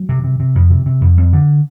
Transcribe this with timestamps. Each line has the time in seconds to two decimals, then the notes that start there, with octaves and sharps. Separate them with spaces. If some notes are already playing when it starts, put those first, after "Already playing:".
Already playing: F#3
0.09 C3
0.24 C3
0.40 C3
0.55 F2
0.70 C3
0.86 C3
1.01 F2
1.17 F2
1.33 D3